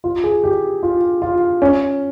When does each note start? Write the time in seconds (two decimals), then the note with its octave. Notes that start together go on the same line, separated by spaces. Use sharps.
0.04 F4
0.24 G#4
0.44 G4
0.83 F4
1.22 F4
1.62 C#4